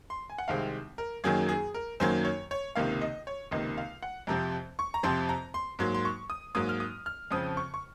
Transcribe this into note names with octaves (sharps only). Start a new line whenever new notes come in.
C6
G#5
F#5
C2 C3 D#3 G#3 C4 F5
A#4
F#2 D#3 F#3 A#3 G#4
G#4
A#4
F#2 D#3 F#3 A#3 C5
C#5
C#5
C#2 C3 D#3 A#3 F5
D#5
C#5
C#2 C3 D#3 A#3 D#5
F5
F#5
F2 C3 F3 C4 A#5
C#6
A#5
F2 C3 F3 C4 C6
A#5
C6
G#2 F#3 A#3 C6
C6
C#6
D#6
G#2 F#3 A#3 D#6
F6
D#6
F6
F2 C#3 F3 C4 D#6
C#6
C#6